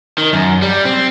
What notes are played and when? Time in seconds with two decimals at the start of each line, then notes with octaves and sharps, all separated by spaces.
0.18 D#3
0.33 F#2
0.62 G3
0.85 C4